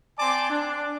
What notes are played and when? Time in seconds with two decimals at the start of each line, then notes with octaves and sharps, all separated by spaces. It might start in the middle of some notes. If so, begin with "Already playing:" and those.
0.19 C4 D5 G#5 A5 C6 D6
0.50 D4